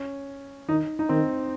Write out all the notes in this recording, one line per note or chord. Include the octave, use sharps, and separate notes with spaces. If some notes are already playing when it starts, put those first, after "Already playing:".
Already playing: C#4
D#3 D#4
D#4
D#3 C4